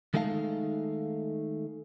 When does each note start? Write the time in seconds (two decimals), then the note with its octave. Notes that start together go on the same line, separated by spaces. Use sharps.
0.14 D#3 G#3 A3 D#4 F5 A5